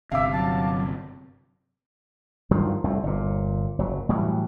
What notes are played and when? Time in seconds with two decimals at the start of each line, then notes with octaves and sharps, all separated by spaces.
0.12 G1 C3 E5 F5 D6
0.32 F#3 A5
2.51 G2 D#3 F3 F#3
2.84 C2 F2 A2
3.03 G1 A#2
3.79 F#1 F#3
4.09 A2 E3 F#3 G3